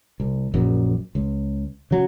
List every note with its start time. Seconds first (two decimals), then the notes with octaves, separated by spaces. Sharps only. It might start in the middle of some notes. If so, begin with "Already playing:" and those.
0.20 C2
0.54 A#1 F#2
1.15 C#2
1.91 C#3 F#3